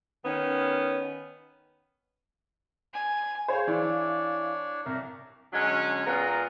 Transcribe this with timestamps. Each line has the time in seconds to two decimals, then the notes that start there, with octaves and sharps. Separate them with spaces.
0.24 D#3 B3 C#4
2.93 G#5
3.48 G#4 C5 C#5 F5
3.67 E3 D4 C#5 D5 F5
4.86 C2 A#4
5.53 D3 F#3 G#3 C#4
6.06 A#2 G#3 B3 F5 A#5